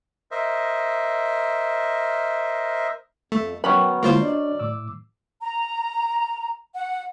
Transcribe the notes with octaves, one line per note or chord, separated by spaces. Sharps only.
A#4 C5 D#5 E5
F2 A3
F#3 B3 C#4 A#4 G5 B5
D3 G#3 A#3 E4 F4 C5
D4 D5 D#5
A2 D6 E6
A#5
F#5